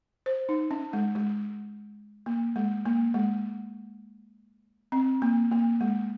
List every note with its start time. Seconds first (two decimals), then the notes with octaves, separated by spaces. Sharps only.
0.26 C5
0.49 D#4
0.71 C#4
0.93 G#3
1.15 G#3
2.26 A#3
2.56 G#3
2.86 A#3
3.14 G#3
4.92 C4
5.22 A#3
5.51 A#3
5.81 G#3